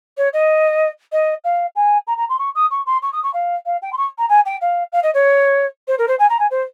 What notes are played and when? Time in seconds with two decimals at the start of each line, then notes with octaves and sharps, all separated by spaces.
0.18 C#5
0.33 D#5
1.12 D#5
1.44 F5
1.76 G#5
2.07 A#5
2.18 A#5
2.29 C6
2.39 C#6
2.55 D#6
2.71 C#6
2.86 C6
3.02 C#6
3.13 D#6
3.23 C#6
3.34 F5
3.66 F5
3.82 G5
3.93 C6
3.97 C#6
4.18 A#5
4.29 G#5
4.46 G5
4.61 F5
4.92 F5
5.03 D#5
5.14 C#5
5.88 C5
5.98 A#4
6.08 C5
6.19 G#5
6.30 A#5
6.39 G#5
6.51 C5